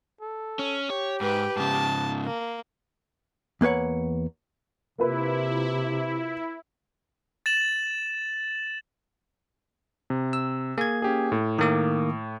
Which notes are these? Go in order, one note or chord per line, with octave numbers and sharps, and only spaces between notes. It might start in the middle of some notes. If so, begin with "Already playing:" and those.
A4
C#4
G4 C#5
G#2 B4 G5
G#2 C#3 A5
A#3
E2 A#3 B4 C#5 F#5
C3 A#3 E4 F4 B4
A6 E7 F#7
C3
E6
A#3 G#4 G#6
C#4 G4 G#4
A2
D#3 A#3 D6